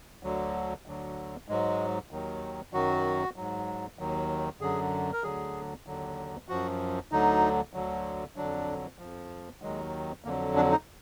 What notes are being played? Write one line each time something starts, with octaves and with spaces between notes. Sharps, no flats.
D2 D3 F#3
D2 D3 F#3
G#2 F#3 G#3
D#2 D#3 F#3
F#2 D#3 F#3 F#4
G#2 F#3
D#2 D#3 F#3
F#2 D3 F#3 G#4
A#4
D2 D3 F#3 G#4
D#2 D3 F#3
F#2 F3 F#4
D2 D3 F#3 D#4
D2 D3 F#3
F2 D3 F#3 D4
F2 F3
D#2 D#3 F#3 G#3
F2 D3 F#3 A#3
D4
D#4